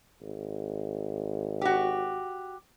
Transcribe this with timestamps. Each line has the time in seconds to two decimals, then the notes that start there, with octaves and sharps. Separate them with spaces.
0.21 G#1
1.61 F#4 G4